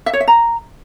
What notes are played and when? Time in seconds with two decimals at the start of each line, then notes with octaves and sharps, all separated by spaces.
0.06 E5
0.13 C#5
0.20 E5
0.28 A#5